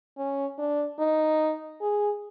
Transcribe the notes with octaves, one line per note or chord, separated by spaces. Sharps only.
C#4
D4
D#4
G#4